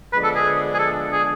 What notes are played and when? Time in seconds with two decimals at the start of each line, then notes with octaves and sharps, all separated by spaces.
0.13 D3 F3 G#3 B3 D4 B4
0.24 A4
0.36 G#4
0.74 G#4
0.79 A4
1.13 G#4